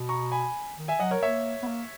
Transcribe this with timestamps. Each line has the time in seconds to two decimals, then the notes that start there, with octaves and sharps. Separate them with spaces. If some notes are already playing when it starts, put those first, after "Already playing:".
Already playing: B2
0.09 A#5 C#6
0.32 G#5 B5
0.77 D#3
0.88 E5 G#5
0.99 F#3 D#5 F#5
1.11 A#4 C#5
1.23 A#3 C#5 E5
1.62 B3
1.67 A#3